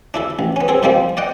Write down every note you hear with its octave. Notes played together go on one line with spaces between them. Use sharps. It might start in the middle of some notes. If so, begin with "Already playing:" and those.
D4 E4 A4
A1
B3 C#4
C4 G#4 A4
G#2 D#3 F3 G3 A#3 C4
D5 D#5 F#5 G5